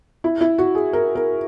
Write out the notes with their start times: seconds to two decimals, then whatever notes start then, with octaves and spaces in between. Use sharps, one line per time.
0.24 E4
0.41 E4
0.58 F#4
0.75 G#4
0.93 A#4
1.15 A#4